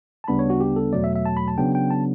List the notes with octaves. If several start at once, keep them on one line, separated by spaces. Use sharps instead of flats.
A5
D2 C#3 G3 B3 D4 B5
C#5
F#4
G4
A4
E2 B2 F#3 A3 D5
E5
E5
A5
B5
A5
C#3 F#3 B3 D4 G5
G5
A5